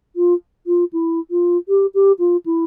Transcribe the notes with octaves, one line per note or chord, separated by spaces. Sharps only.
F4
F4
E4
F4
G4
G4
F4
E4